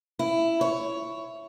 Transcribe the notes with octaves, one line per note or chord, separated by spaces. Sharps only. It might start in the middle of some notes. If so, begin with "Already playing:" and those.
E4
C#5